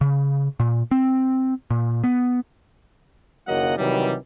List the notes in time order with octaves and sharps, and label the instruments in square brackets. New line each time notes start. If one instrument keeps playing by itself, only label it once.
[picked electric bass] C#3
A#2
C4
A#2
B3
[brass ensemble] F#1 D#2 F#3 A#3 D#5 F#5
C3 D#3 E3 F#3 G3